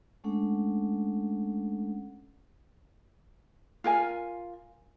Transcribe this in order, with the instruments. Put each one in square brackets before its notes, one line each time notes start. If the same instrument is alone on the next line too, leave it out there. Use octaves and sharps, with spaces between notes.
[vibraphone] G#3 A3 C#4 D4 A4 F#5
[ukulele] F4 A#4 G#5